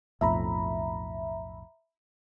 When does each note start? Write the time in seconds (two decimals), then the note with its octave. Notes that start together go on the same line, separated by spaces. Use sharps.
0.21 B1 F2 A2 E5 A#5 B5